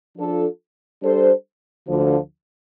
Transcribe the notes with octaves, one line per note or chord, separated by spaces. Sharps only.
F3 D4 F4 A4
G3 D4 A4 C5
D2 D3 F3